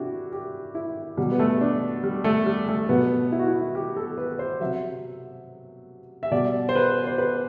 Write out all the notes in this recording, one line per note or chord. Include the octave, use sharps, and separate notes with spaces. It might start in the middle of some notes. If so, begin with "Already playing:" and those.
Already playing: C3 D4 E4 F#4 G4
G4
E4
B2 F#3 G3
B3
A3
D4
G3
A3
G3
A3
B2 F#3 B3
E4
F#4
E4
G4
A4
B4
C5
C3 F#3 E5
E5
B2 G3 D5
C5
B4
C5
B4